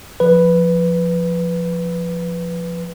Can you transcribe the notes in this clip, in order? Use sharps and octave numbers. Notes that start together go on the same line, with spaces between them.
F3 B4